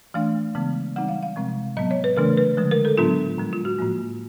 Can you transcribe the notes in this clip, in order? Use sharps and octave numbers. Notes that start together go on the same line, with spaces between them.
E3 A3 D4 F5
C#3 E3 G#3 B3
E3 G3 C4 D#4 F#5
F5
F5
C3 F3 G#3 C4
A2 F#3 B3 D#5
C#5
B4
C#3 E3 A3 D4 A#4
B4
D3 F3 G#3
A#4
A4
A2 F#3 B3 D4 F4
A2 F3 G#3
F4
F#4
A2 F3 A#3